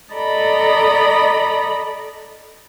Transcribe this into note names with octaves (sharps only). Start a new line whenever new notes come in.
A4 D5 D#5 A#5 B5